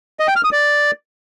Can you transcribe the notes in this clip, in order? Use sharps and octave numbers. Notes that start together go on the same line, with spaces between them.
D#5
G5
F6
D#6
D5